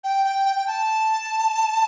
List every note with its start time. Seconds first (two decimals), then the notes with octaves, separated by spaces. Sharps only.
0.04 G5
0.25 G5
0.46 G5
0.56 G5
0.67 A5